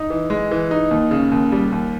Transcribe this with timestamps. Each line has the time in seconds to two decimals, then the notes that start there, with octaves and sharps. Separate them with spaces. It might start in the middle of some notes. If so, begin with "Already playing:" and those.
Already playing: D#4
0.10 E3
0.30 G#3
0.51 E3
0.71 D#4
0.91 D#2
1.11 C#3
1.32 D#2
1.52 G3
1.72 D#2